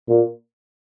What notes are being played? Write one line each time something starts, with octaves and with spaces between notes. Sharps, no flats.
A#2